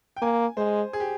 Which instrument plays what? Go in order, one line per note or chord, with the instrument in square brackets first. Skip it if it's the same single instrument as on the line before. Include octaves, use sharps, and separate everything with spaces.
[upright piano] G5
[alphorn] A#3 [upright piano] G#5
[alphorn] G#3 [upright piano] C5
[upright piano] G#4
G4